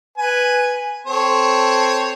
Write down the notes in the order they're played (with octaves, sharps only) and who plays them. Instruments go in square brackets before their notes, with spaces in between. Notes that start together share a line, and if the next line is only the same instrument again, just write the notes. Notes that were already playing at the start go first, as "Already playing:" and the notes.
[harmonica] B4 G#5
C4 A4 C#5